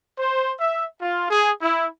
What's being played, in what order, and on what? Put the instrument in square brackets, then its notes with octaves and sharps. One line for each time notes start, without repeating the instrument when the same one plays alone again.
[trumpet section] C5
E5
F4
G#4
E4